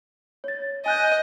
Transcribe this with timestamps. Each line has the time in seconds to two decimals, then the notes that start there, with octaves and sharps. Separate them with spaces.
0.44 C#5 A6
0.86 D#5 G#5 F#6 G6